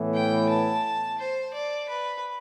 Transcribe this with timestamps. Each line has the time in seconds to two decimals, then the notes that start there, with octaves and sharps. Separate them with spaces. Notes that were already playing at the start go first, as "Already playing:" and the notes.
Already playing: A2 E3 B3
0.14 G5
0.49 A5
1.19 C5
1.54 D5
1.89 B4